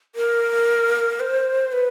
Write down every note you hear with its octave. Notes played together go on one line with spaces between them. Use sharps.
A#4
C5
B4